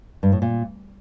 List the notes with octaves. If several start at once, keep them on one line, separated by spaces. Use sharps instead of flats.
G2
A2
A#2